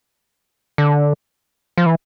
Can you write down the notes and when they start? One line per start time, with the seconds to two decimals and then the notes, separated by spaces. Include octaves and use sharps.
0.78 D3
1.78 F3
1.86 E3